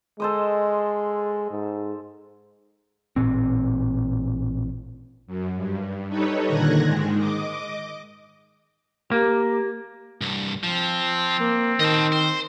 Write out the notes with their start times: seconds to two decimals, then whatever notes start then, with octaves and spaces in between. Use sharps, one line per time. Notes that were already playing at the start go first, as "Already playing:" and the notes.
0.20 G#3 A4 C5 D#5
1.51 G#2
3.16 A1 A#2 C4
5.27 F#2
5.56 G2
6.09 G3 D#4 A4 B4 C#5
6.46 A#2 D3 D#3 F#6 G#6 A#6
6.83 G#2 D#3 G#3
7.17 D#5 D6
9.11 A#3 G4
10.21 C2 G2
10.64 F3 C4
11.41 A#3
11.80 D#3 D#5 A5
12.12 C5